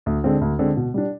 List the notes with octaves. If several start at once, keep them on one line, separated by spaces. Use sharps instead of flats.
D2
D3 G#3 C4
D2
D3 G#3 C4
B2
G3 D4